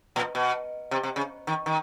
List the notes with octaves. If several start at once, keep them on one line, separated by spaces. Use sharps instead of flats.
A#2
B2
C3
C3
C#3
D#3
D#3